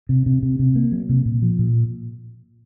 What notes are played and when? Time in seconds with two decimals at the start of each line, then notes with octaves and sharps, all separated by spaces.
0.09 C3
0.26 C3
0.43 C3
0.59 C3
0.76 A#3
0.92 F#3
1.09 C3
1.26 A#2
1.42 F3
1.59 A#2